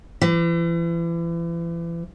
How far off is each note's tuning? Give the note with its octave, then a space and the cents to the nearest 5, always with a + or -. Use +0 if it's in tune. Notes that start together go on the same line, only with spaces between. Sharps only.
E3 +35